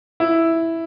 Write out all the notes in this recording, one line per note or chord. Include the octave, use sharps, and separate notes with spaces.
E4